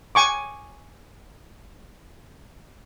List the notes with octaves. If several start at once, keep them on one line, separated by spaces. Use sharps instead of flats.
G#5 C#6 D6